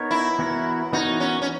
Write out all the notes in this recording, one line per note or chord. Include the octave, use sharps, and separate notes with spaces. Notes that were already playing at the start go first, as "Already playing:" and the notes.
Already playing: B3 D#4 A#4 C#5
E4
E3 B3 F#4 A#4 C#5
E3 B3 D#4 F#4 A#4 C#5
C#4
C#4